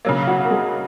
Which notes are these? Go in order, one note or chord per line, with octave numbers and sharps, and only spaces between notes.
C#3 F#3 A#3
F#4 F#5
A#4
G#3 G#4